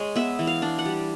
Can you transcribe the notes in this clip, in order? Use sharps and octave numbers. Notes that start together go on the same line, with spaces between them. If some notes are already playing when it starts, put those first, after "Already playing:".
Already playing: G#3 C#5
B3 E5
E3
F5
D4
F#5
G3